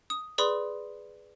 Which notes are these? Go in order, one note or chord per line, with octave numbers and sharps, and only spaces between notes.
D#6
G#4 B4 D5 B5 C6 D#6